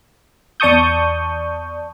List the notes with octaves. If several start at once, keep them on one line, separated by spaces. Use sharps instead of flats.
E2 D5 A5 C#6 D#6 G6